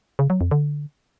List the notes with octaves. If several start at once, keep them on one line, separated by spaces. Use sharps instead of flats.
C#3
F#3
F2
D3